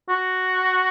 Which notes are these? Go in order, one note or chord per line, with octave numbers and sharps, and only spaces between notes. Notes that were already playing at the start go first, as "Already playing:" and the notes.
F#4